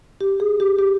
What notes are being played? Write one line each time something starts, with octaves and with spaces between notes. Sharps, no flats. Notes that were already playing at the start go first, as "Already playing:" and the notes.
G4
G#4
G4
G4